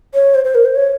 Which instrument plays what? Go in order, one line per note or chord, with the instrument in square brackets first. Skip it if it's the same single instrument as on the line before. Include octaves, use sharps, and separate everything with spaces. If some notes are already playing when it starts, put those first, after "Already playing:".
[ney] C#5
C5
C5
A#4
C5
C#5